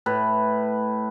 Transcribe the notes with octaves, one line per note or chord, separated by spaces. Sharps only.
A2 B4